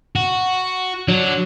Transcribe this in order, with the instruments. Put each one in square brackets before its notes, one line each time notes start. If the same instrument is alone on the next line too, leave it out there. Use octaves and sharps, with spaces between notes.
[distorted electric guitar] F#4
[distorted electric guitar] D3 [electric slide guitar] F#3